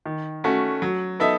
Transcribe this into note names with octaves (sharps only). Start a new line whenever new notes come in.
D#3
A3 C#4 F#4
F#3
B3 D#4 A4 E5